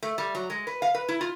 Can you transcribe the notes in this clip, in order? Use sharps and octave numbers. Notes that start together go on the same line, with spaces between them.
A3
G3
F#3
G#3
B4
F5
B4
E4
F4